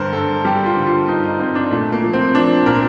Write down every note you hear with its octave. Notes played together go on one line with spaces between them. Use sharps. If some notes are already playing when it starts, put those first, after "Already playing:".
Already playing: G2 D3 G3 A#4 C5
G2 A4
G3 G4
F4
D3
F4
G2 D#4
D#4
G2 C4
D4
A#2 A3
A#3
F3
C4
F3 D4
A#2 A#4